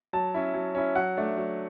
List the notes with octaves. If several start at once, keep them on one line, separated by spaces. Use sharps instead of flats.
F#3 A5
C#4 E4
F#3
C#4 E4
F#3 F#5
A3 D4
F#3